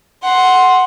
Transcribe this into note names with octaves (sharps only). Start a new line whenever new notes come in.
F#5 C6